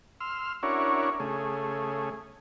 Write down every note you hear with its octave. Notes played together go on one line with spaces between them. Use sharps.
C6 E6 F6
C#4 D4 E4 F#4 A#4 C#5
C#3 A3 G#4